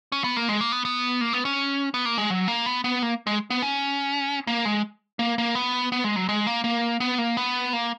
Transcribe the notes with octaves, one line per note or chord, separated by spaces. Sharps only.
C#4
B3
A#3
G#3
A#3
B3
B3
A#3
B3
C#4
B3
A#3
G#3
F#3
A#3
B3
B3
A#3
G#3
B3
C#4
A#3
G#3
A#3
A#3
B3
B3
G#3
F#3
G#3
A#3
A#3
B3
A#3
B3
A#3